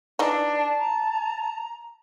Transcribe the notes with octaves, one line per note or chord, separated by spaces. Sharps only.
E3 D4 D#4
A5
A#5